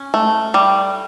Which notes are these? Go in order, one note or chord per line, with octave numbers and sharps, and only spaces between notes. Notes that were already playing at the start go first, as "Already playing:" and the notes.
Already playing: C#4
A3
G3